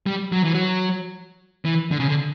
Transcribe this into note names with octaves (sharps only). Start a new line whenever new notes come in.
G3
F#3
E3
F#3
E3
D3
C#3
D3